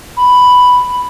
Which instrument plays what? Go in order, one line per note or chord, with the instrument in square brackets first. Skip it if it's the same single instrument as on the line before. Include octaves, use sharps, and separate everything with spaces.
[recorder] B5